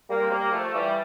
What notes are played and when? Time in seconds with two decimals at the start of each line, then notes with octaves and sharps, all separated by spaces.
0.10 G3 A#3
0.21 C4
0.31 G3 A#3
0.52 F3 A3
0.74 E3 G3